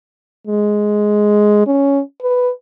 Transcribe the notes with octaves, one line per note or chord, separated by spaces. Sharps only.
G#3
C#4
B4